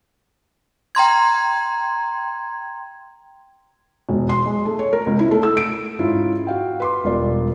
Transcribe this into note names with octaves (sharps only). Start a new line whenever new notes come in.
G5 A#5 C6 G#6
E1
C6
G#3
A3
C#5
A#4
C#2
E4
A3
E6
D7
G#2 C#4 E4 F4
F#4 F5 G5
B4 C6 D6
E1 G3 F4 D5